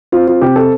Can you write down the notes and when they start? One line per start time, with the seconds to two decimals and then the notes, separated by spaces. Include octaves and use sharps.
0.12 C4 F4
0.27 F4
0.41 C3 G4
0.56 A4